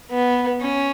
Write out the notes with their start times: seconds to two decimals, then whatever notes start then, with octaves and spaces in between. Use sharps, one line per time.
0.10 B3
0.61 C#4